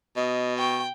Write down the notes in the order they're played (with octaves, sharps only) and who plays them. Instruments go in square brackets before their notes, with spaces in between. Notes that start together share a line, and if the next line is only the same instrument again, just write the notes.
[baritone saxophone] B2 [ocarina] D#5
[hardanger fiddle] G5 [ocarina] C#6